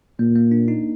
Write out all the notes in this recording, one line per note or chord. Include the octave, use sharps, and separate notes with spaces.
A#2 A#3
A#3
D4
D#4